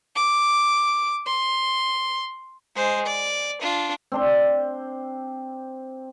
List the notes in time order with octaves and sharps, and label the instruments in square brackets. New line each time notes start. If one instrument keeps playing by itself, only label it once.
[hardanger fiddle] D6
C6
G#3 C5
D5
D4 F4
[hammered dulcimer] C4 D4 C6